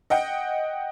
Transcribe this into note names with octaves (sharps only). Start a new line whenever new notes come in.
D#5 F#5 G5